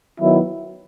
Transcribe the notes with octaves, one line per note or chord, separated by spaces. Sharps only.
D#3 F#3 B3 E4